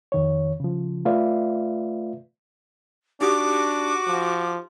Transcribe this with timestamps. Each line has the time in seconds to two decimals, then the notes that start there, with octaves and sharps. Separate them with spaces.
0.12 F2 D#3 C#5
0.60 C#3 F3
1.05 A3 F4 B4 D5 E5 F5
3.21 D4 D#4 F#4 G4 D6 D#6
4.07 F3